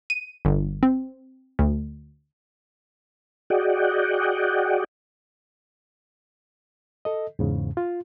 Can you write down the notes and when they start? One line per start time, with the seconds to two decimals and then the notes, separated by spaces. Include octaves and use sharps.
0.10 D#7
0.45 G1
0.83 C4
1.59 D2
3.50 F#4 G#4 D5 D#5 F#5 G5
7.05 A4 D#5
7.39 E2 G#2 C#3
7.77 F4